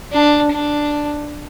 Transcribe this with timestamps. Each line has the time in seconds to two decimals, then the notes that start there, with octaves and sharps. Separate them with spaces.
0.13 D4
0.52 D4